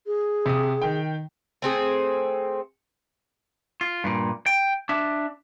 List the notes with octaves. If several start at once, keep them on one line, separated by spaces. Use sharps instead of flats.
G#4
C3 D#6
D#3 G5
A3 C4 G#4
F4
G2 A#2
G5
D4 E5